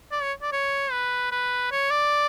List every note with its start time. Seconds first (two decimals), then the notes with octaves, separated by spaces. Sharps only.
0.12 D5
0.22 C#5
0.42 D5
0.52 C#5
0.92 B4
1.32 B4
1.72 C#5
1.91 D5